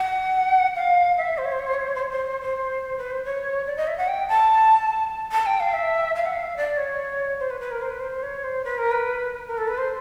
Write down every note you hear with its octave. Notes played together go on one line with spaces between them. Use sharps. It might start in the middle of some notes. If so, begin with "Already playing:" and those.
Already playing: F#5
F5
E5
C5
C#5
C5
C#5
C5
C#5
C5
C#5
C5
C#5
C5
C5
B4
C5
C#5
D5
D#5
E5
F#5
G5
A5
A5
G5
F5
E5
F5
F#5
F5
D5
C#5
C5
B4
B4
A#4
C5
B4
C5
C#5
C5
B4
A#4
B4
A#4
A4
B4
C5